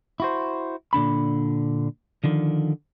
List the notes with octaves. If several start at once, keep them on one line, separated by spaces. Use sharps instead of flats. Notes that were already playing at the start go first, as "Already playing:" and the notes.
E4 F#4 C5
A#2 D3 D4 B5
D3 D#3 F3